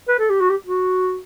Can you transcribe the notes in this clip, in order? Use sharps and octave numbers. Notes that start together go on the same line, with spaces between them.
B4
A4
G4
F#4
G4
F#4